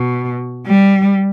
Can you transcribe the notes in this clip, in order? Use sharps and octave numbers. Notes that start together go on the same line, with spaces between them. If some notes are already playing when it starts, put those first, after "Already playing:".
Already playing: B2
G3